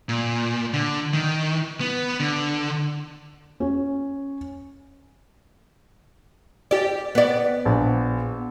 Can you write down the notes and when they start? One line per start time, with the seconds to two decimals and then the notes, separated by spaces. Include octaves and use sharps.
0.09 A#2
0.73 D3
1.14 D#3
1.80 B3
2.20 D3
3.60 C#4
6.71 G4 D5
7.15 B3 D5
7.65 A#1